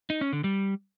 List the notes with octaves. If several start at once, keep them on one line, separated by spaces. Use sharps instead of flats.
D#4
C#4
D3
G3